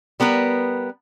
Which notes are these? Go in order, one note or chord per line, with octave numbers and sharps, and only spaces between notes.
G3 B3 A#4 B4